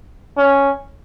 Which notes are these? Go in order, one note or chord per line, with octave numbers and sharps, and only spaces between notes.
C#4